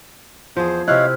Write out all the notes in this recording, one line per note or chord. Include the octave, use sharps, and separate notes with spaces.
E2 F3 G#4 C5
C3 E4 C#5 D#5 F5 F6 F#6